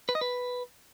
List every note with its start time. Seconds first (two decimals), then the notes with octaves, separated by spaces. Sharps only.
0.09 B4
0.15 D#5
0.21 B4